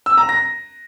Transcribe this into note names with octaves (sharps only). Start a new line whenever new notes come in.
E6
A#5
A#6